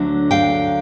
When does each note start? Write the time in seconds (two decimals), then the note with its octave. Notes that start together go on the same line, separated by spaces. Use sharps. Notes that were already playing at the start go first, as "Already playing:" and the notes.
Already playing: D2 D3 F#3 A3
0.31 F5 G5